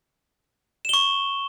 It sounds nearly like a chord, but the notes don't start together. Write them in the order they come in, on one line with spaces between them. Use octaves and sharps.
E7 G7 C#6